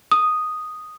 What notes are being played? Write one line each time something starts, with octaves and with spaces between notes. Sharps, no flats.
D#6